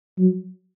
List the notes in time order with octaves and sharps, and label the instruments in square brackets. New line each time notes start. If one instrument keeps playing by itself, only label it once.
[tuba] F#3